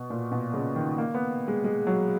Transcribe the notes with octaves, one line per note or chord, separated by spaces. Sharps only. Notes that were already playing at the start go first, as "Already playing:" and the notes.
Already playing: B2
A#2
B2
C#3
D#3
A#3
B3
G#3
G#3
F#3